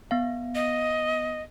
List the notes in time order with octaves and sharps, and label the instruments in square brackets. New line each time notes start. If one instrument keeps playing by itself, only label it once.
[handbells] B3 F5
[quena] D#5